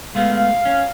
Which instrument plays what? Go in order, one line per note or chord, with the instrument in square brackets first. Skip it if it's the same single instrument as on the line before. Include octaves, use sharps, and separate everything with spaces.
[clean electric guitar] G#3 A3 B3 [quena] F5
[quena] F5
[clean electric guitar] C#4